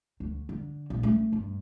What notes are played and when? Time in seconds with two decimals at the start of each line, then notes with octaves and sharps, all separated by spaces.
0.20 D2
0.49 D3
0.90 A#1
1.03 A3 C#4
1.33 G2